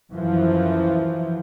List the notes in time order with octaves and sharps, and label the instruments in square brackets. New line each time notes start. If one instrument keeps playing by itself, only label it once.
[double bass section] F#2 E3 F3